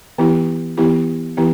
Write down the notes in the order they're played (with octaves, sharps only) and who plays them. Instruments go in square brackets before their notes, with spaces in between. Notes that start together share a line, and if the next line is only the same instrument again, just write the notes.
[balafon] E3 B3 E4 G4
E3 B3 E4 G4
E3 B3 E4 G4